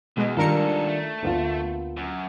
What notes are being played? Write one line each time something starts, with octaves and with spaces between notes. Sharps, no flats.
E2 B2 G#3
G#2 D#3 G3 D4 F4 A4 A#4 C#7
A3
D2 A#3 B3 F4
F#2